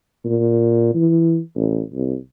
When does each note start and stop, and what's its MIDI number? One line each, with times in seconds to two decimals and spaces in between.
0.25 0.91 46
0.94 1.38 52
1.56 1.81 33
1.93 2.15 36